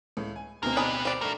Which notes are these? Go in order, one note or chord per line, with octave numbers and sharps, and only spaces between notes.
C#2 A2
G#5
D2 B2 A#3 C4 A#4
D4 D#4 G4 G#4 B4
C5 D5
A3 D4 F#4 A#4